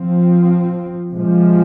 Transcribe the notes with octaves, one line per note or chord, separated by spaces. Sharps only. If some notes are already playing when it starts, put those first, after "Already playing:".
Already playing: F3 C4
C3 F3 G#3